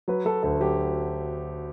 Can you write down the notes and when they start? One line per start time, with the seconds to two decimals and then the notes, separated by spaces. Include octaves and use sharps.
0.08 F#3 B4
0.25 F#3 A4
0.43 D2 A4
0.60 F#3 G4